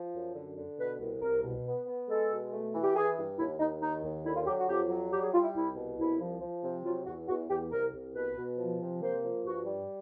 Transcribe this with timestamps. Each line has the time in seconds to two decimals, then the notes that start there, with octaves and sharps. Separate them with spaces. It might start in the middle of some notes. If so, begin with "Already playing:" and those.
Already playing: F3
0.15 F#2
0.35 D3
0.57 D3
0.79 B2 B4
1.00 C2
1.22 C2 A#4
1.43 B2
1.65 B3
1.87 B3
2.09 G#3 A4
2.31 B2
2.53 A3
2.73 E3
2.84 G4
2.95 E3 G#4
3.17 G2
3.38 D#2 E4
3.60 D#2 D#4
3.82 D#3 D#4
4.03 D#2
4.26 D3 E4
4.37 F4
4.46 F#3 G4
4.58 F#4
4.68 F2 G4
4.90 F#3
5.12 G3 G4
5.23 G#4
5.33 G3 F4
5.44 E4
5.55 C2 E4
5.77 B2
5.98 C2 E4
6.21 F3
6.41 F3
6.63 C3
6.85 F#3 F4
7.06 E2 F#4
7.29 E2 F#4
7.49 E2 G4
7.71 C2 A#4
7.93 C2
8.15 B2 B4
8.37 B2
8.58 F3
8.80 C3
9.01 A#3 C5
9.23 F3
9.44 G2 F#4
9.66 G3